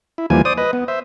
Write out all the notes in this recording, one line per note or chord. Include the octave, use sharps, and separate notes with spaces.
E4
D#2 E3 F3 G3 A#3 G#5
C5 D5 D#6
B4 D#5
B3
C5 E5